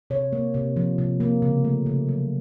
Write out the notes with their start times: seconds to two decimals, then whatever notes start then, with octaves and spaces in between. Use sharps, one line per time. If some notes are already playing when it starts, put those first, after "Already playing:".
0.10 C3 C#5
0.33 A#3
0.54 C3
0.76 F3
0.98 C3
1.20 A#3
1.42 C#3
1.64 A3
1.86 C#3
2.08 F#3